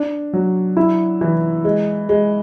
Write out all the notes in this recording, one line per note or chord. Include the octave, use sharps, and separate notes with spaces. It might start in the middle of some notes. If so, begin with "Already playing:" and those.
Already playing: D4
F#3
E4
E3
G#3
G#3